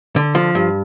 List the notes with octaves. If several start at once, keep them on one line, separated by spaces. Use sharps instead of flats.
D3
F3
G2